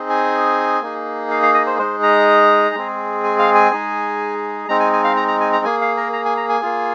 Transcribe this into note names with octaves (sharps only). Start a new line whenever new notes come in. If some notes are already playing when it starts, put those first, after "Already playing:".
Already playing: C4 D#4 G#4
G#5
A#3 D#4 G#4
F5
F5
D#5
C5
G#3 D#4 G#4 C5
A#5
G#3 C4 G#4
G#5
F5
G#5
G#3 D#4 G#4
G#3 C4 D#4 A#5
G#5
G#5
F5
A#5
A#5
G#5
A#5
A#3 G#4 G#5
F5
A#4
A#5
G#5
A#5
G#5
A#3 F4 G#4